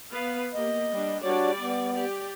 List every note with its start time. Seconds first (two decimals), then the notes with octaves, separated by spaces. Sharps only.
0.11 B3 B4 F5
0.54 A#3 G4 D#5
0.91 G3 D4
1.23 G3 D4 F#4 C#5 D5
1.59 B3
1.95 G4 D5